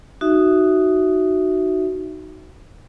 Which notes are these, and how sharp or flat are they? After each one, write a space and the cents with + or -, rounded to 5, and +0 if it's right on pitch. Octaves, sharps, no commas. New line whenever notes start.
D#4 -5 F#4 +5 E5 +0